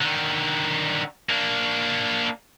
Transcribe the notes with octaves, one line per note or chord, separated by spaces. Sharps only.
D3 D#3
A#3 D4